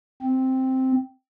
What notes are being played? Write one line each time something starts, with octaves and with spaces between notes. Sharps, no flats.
C4